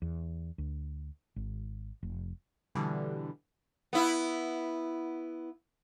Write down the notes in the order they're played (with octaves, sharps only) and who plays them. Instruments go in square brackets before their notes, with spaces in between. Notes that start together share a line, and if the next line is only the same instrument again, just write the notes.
[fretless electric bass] E2
D2
G#1
F1
[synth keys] B2 D3 E3 G3
[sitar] B3 E4